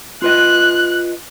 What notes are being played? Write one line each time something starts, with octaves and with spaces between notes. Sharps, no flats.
F4 B4 D#5 F#6